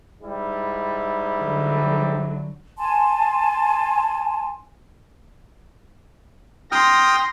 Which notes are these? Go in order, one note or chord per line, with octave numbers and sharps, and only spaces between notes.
G#2 G3 E4
D3 F#3
G#5 A5 C6
G5 C6 D#6 F6 A#6